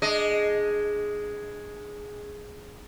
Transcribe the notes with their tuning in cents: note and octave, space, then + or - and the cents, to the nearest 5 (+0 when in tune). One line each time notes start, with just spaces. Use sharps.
G#3 +0 D4 +10 D#5 +0